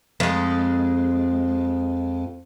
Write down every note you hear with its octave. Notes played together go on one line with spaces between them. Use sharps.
F2 G#3